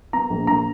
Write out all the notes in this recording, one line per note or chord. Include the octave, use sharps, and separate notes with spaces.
B3 A#5
A#1
A#1 A#5